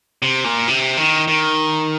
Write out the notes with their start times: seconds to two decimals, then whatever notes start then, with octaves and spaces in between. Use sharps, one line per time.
0.22 C3
0.44 A#2
0.68 C3
0.97 D#3
1.28 D#3